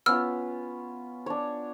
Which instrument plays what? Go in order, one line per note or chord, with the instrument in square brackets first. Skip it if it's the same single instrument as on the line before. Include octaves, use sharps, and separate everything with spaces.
[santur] B3 C#4 F4 [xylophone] E6 F6
[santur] D4 C#5